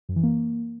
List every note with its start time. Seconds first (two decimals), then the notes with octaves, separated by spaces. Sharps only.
0.09 F#2
0.16 E3
0.23 A#3